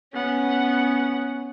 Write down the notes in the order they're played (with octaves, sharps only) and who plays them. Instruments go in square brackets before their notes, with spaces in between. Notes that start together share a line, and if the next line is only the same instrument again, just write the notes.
[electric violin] B3 F#5 [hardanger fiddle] C#4